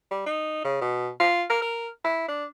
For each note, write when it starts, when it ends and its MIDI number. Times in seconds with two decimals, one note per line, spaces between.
0.11 0.21 55
0.26 0.62 63
0.64 0.78 49
0.81 1.09 47
1.20 1.43 65
1.50 1.61 70
1.62 1.88 70
2.04 2.25 64
2.28 2.45 62